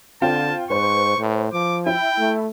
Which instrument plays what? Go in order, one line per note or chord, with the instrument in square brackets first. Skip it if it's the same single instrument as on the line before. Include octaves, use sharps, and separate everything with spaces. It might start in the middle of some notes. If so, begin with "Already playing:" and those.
[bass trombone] D3 [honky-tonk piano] C4 F4 G5 [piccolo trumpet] A5
[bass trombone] G#2 [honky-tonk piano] B4 C5 [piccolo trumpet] C#6
[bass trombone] A2
[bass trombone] F3 [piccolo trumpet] D6
[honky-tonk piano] E4 [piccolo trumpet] G5
[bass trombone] A3